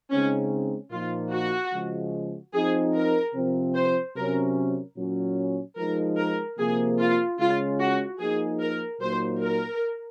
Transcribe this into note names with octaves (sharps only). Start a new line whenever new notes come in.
C#3 G#3 C4 C#4 D#4
A#2 F3 A#3 D#4 F4
F#4
C#3 F3 G#3
F3 C4 D#4 G#4
A#4
C3 F3 C4
C5
C3 F#3 C#4 A#4
A#2 F#3 C#4
F3 G#3 D#4 A#4
A#4
C3 F3 A#3 G#4
F4
C#3 G#3 C#4 F4
F#4
F3 A#3 D#4 G#4
A#4
A#2 F#3 A#3 D#4 C5
A#4